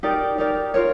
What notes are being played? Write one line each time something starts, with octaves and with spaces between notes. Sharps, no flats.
D#4 G4 A#4 D5
D#4 G4 A#4 D5
F4 A#4 C#5